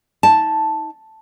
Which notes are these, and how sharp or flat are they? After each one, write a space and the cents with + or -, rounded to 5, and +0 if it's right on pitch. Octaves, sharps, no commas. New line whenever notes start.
D#4 +40 A5 +0